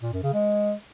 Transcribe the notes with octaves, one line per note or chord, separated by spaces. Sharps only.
A#2
F#2
C#3
G#3